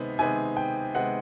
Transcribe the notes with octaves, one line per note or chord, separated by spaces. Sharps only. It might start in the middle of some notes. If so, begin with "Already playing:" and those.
Already playing: C3 D#3 G#3 B3
C3 D#3 G#3 B3 G#5
G5
C3 D#3 G#3 B3 F#5